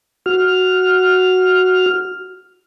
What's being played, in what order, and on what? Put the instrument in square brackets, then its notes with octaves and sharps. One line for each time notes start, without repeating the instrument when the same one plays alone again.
[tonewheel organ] F#4 F6